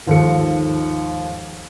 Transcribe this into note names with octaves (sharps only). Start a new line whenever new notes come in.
G#1 D#2 D#3 F3 A4 C#7